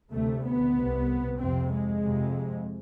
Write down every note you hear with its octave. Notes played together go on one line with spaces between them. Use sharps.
D2 C3 A3
B3
C2 C3
F2 C3 C4
G#3
F2 C3